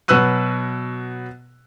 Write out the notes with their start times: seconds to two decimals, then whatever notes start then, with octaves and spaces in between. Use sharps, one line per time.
0.08 B2 F#3 B4 E6 F#6 D#7